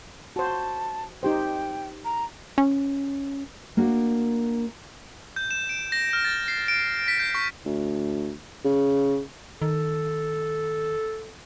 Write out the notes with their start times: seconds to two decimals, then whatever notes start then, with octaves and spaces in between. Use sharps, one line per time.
0.36 F#4 C5 A5
1.23 D#4 G4 C5 G5
2.05 A#5
2.58 C#4
3.77 A#3 D4 F#4 A#4
5.36 G6
5.51 E7
5.69 D7
5.92 A#6
6.13 F6
6.25 A6
6.48 C7
6.68 D7
7.08 B6
7.19 G6
7.35 C#6
7.65 D2
8.65 C#3
9.62 D#3 A4